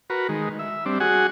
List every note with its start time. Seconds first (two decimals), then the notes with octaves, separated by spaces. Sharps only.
0.10 F#4 A#4 B4
0.29 D#3 G#3
0.59 E5
0.86 G3 C4 D4
1.00 F#4 G#4 F#5 G#5